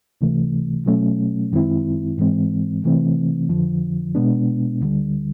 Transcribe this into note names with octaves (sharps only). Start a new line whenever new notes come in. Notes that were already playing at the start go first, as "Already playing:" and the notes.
C#2 C3 E3 A3
B2 F#3 A3 C#4
F#2 D#3 G#3 C4 E4
G#2 E3 G#3 C4
C3 E3 A3 C4
F2 D3 F3
B2 G#3 B3 D4
D2 D3 G3